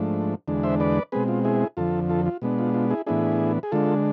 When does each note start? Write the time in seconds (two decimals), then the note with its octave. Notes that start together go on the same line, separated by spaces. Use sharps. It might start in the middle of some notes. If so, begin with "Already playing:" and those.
Already playing: G#2 F3 A3 D4
0.48 E2 D3 G#3 D4
0.63 C5 E5
0.80 B4 D5
1.12 B2 G#3 C4 G#4 B4
1.28 F4
1.45 E4 G#4
1.77 F2 D3 F3 F4 A4
2.09 F4 A4
2.26 F4
2.42 B2 G#3 B3 D4
2.59 F4
2.74 F4
2.90 E4 G#4
3.06 A2 E3 B3 D4 E4 G#4
3.63 G#4
3.72 D3 G#3 D4 F4 A4